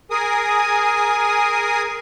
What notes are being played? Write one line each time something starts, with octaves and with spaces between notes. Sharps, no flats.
G#4 A#4 G#5 D#6